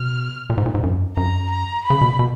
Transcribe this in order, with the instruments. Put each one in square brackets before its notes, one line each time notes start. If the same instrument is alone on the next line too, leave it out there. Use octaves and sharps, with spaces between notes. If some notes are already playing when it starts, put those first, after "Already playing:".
Already playing: [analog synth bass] B2 [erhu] F6
[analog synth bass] A#2
G#2
A#2
G#2
F#2
[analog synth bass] F#2 [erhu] A#5
[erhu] A#5
B5
[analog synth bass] C#3
B2
B2